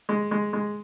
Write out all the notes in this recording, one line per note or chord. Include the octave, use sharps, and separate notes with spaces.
G#3
G#3
G#3